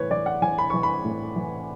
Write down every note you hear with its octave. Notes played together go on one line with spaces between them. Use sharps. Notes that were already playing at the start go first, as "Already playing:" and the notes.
Already playing: A2 E3 B4 C#5
E3 D5
F#5
E3 G#5
B5
E3 C#6
B5
A2
E3